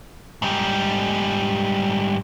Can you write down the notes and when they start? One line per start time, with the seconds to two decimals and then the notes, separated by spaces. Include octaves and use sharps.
0.42 G#2 G3